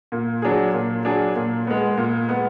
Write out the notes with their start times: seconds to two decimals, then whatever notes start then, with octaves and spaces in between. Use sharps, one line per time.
0.12 A#2
0.42 F#3 D4 G#4
0.73 A#2
1.05 F#3 D4 G#4
1.36 A#2
1.67 G#3 B3
1.97 A#2
2.29 G#3 B3